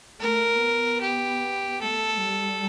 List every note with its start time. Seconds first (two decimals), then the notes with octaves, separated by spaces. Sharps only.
0.20 A3 A#4
0.60 B3
1.01 G4
1.80 A3 A4
2.20 G3